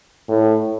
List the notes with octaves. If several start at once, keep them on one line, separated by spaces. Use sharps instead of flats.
A2